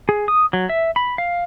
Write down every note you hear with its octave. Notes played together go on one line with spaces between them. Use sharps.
G#4
D#6
F#3
E5
B5
F5